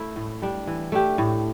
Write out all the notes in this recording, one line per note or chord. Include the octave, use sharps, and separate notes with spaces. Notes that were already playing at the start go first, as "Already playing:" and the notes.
Already playing: A3 E4
A2
G3 D4
E3
A3 D4 G4
A2